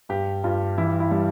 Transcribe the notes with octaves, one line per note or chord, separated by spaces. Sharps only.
G2 G4
G2 F4
E3 E4
E4
G3